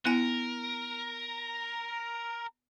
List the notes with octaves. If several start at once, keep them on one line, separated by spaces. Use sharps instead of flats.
B3 E4 A#4 G#5